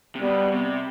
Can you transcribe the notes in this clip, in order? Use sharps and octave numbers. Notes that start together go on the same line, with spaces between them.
C3
B2 G3
C3